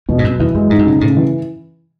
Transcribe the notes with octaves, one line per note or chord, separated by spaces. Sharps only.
E2 B2
G#2
F#2 B2
E2 E3
F#2 G#3
G#2 D#4
F#2
G#2 C#3
A2 C#3
E3